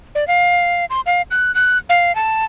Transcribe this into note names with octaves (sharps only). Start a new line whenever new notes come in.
D5
F5
C6
F5
F#6
F#6
F5
A5